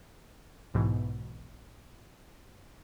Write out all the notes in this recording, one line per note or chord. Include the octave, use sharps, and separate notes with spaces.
B1 G#2 B2 E3